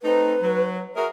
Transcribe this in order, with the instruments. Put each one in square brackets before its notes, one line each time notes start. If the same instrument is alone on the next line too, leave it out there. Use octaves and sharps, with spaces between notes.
[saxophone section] A3 C4 D#4 [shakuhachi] B4
[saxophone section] F#3
[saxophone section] F#4 G#4 A#4 [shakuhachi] E5